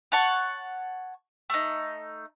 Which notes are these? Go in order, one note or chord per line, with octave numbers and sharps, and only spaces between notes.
C#5 F#5 A5 C#6
A3 D#4